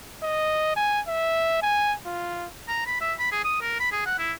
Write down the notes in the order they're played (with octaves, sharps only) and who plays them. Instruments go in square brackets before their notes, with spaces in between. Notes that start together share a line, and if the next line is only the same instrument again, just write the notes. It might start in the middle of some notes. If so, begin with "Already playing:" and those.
[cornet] D#5
G#5
E5
G#5
F4
[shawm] A#5
B5
E5
B5
G#4
D#6
A#4
B5
G#4
F#5
E4